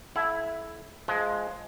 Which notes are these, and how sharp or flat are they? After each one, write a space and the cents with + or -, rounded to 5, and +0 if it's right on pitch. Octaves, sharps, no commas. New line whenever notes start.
E4 +0 A4 -40 F#5 -45
F3 +0 G#3 +10